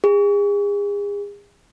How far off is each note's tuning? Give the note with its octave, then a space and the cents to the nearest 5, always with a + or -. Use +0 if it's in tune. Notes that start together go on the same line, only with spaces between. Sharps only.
G#4 -35